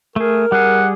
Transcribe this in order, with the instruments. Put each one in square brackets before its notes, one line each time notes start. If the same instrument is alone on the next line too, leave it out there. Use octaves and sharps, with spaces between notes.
[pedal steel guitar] A3 G#4 [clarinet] A#4
[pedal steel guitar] G3 G#4 [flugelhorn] F#5